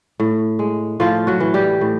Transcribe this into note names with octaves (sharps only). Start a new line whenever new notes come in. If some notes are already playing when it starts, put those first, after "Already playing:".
A2
G#3
A2 F3 F4
F#3 F#4
E3
G3 G4
A2